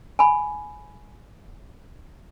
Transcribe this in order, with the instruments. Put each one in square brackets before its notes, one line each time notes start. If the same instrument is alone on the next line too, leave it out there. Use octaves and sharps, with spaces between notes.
[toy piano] G#5 B5